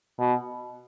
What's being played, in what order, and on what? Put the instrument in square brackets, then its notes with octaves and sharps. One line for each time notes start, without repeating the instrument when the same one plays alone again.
[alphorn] B2